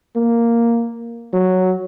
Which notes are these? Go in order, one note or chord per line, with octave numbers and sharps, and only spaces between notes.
A#3
F#3